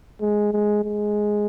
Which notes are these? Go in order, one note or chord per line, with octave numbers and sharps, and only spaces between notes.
G#3
G#3
G#3